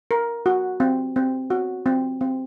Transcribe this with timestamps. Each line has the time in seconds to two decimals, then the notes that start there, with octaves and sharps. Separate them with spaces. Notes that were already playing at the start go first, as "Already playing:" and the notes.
0.11 A#4
0.46 F#4
0.80 C4
1.16 C4
1.50 F#4
1.86 C4
2.21 C4